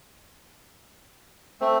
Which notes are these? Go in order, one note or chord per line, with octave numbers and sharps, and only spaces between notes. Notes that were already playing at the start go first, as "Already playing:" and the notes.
A3 C4